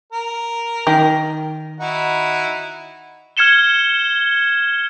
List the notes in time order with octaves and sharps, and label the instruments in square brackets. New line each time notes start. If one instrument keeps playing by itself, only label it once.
[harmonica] A#4
[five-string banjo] D#3
[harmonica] D#4 E4 F#4
[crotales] F6 G#6 C#7 E7 G7